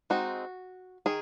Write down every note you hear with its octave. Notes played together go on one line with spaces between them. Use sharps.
G#3 C4 D#4 F#4
D#3 G#4